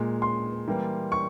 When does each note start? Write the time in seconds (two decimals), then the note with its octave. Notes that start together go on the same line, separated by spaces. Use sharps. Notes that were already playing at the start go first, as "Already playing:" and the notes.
Already playing: A#2 G#3
0.22 C6
0.67 E3 G3 A#3
1.12 C#6